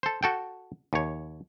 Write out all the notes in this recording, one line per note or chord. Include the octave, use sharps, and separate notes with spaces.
A4 C5
F#4 A4 G5
D#2 C#5